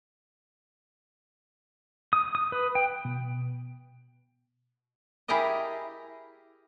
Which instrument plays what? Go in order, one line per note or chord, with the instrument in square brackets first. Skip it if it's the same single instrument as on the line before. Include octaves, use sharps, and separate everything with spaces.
[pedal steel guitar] D#6
D#6
B4
G5
[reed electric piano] B2
[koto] E4 G4 G#4 A#4 D5 D#5